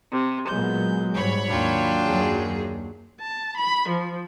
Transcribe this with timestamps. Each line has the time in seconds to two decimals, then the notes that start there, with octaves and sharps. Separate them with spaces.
0.13 C3
0.49 A#2 F#3 G#3 B3 G6
1.14 G#2 G3 C#5 B5
1.50 D#2 F#3 D4 F4 G5
2.06 F#2 G#4
3.20 A5
3.56 B5
3.88 F3